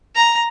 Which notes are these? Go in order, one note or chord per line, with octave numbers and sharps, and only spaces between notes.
A#5